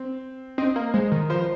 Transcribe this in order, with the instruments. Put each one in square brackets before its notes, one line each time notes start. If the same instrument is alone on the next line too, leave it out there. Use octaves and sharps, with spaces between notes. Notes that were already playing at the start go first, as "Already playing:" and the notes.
Already playing: [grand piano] C4
[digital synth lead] C4 [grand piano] D#5
[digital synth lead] A#3
[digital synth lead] G#3 [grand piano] C5
[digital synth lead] D#3 [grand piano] A#4
[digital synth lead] F3 [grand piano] C5
[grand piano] C5